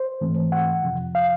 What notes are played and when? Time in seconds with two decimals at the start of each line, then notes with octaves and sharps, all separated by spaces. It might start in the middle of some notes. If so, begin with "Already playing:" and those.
Already playing: C5
0.21 G#2 E3 A3 C4
0.52 F#5
0.83 F2 C3 F3
1.15 F5